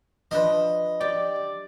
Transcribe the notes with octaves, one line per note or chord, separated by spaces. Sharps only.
F3 D4 B4 D#5
G4 D5